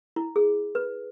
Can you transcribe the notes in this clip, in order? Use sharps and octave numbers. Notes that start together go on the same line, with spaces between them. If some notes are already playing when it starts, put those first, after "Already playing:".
E4
G#4
B4